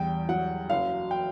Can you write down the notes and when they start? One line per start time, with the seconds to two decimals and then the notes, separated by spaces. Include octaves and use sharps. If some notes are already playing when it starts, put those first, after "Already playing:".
Already playing: E2 G3 G5
0.29 F#3 F#5
0.70 F#1 F5
1.11 G5